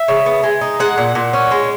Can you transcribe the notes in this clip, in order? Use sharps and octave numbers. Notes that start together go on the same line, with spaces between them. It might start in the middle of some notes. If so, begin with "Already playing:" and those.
Already playing: E5
C#3
B3
G#3
D#4
G#3 F#5
A#2
A#2
C#4
G#3